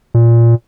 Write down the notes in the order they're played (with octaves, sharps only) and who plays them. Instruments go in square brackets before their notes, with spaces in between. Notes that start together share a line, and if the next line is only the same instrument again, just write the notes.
[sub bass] A#2